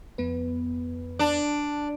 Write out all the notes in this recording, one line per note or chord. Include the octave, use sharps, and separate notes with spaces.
F2 B3 B4
D4